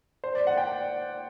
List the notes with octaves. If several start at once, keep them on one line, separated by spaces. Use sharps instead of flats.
C5
D5
F#5
G5